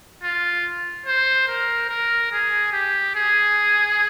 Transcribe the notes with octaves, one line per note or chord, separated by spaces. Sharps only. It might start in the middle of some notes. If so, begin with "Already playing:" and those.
F4
C5
A#4
A#4
G#4
G4
G#4